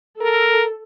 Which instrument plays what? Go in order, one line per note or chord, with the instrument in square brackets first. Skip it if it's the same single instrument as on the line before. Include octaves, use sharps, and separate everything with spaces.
[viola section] A4 [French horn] A#4